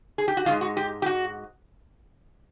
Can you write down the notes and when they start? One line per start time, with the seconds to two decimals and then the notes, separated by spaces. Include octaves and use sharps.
0.18 G#4
0.28 G4
0.37 F#4
0.46 D#3 G#3 F4
0.51 G#2
0.61 F#4
0.77 G4
1.02 G4
1.06 F#4